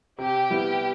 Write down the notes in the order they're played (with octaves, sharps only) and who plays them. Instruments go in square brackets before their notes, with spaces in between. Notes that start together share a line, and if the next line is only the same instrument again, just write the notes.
[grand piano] C3 [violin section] G4
[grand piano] G3 B3 E4